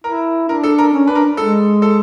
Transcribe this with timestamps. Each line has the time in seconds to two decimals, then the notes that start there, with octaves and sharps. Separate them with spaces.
0.04 E4 A#4
0.49 D4 A#4
0.63 A4
0.78 A#4
0.93 C#4
1.07 D4 B4
1.15 A#4
1.37 G#3 A4
1.82 A4